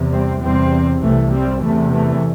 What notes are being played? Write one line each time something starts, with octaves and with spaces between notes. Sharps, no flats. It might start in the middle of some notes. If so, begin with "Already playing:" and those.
Already playing: E2 C3
G3 C4
E2 C3 G3 C4
C2 C3 E3 A3
G3 C4
E2 C3 E3 A3
E3 A3